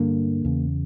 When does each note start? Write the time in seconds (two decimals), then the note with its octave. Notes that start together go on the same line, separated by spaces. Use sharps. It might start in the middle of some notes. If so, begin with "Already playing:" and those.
Already playing: G2 D3 A#3
0.44 E2 C#3